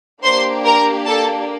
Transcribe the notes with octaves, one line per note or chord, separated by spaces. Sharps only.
A#3 D4 G4 C5 C6
A#4 A#5
A4 A5